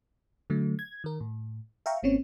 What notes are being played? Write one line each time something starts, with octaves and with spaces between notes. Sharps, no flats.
D3 F#3 A3
G#6
D#3 A#4
A2
E5 F5 G5 A#5 C#6
G#1 A#3 C4 C#4 C#5